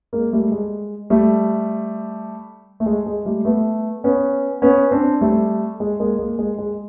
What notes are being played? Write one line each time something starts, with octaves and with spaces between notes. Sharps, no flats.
G#3 A#3
G3 A3
G#3
G3 A3
A3
G#3
G#3
G3 A3
A3 B3
B3 C#4
B3 C#4
C4 D4
G3 A3
G#3
G#3 A#3
G#3 A#3
G#3
G#3